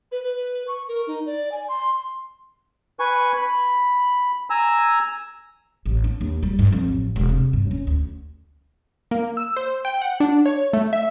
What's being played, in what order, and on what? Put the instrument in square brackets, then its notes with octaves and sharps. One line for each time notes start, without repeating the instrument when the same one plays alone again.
[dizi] B4
B4
C#6
A#4
D#4
D5
G#5
C6
[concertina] B4 G#5 C#6
B5
G#5 A#5 E6
[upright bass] A1
D4
D#2
G3
G2
F2
A1
E1
C3
G2
C#4
D2
[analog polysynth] A#3
E6
C5
G5
F#5
D4
C#5
A3
E5